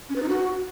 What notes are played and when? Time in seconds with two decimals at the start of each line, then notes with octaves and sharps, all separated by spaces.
0.09 C#4
0.16 B4
0.22 D#4
0.29 F#4